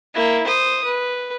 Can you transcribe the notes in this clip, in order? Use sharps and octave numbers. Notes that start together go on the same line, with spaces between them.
A#3 E4
C5 D#6
B4